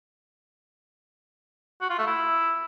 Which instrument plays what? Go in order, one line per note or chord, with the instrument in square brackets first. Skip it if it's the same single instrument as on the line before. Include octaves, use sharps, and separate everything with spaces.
[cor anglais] F#4
F4
A3
E4